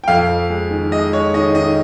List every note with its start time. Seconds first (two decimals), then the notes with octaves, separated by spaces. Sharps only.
0.04 G5
0.08 F2 F5
0.29 F2
0.50 G#3
0.70 D#3
0.91 G#3 D#5
1.13 G#3 C#5
1.33 D#3 D#5
1.55 D#3 D#5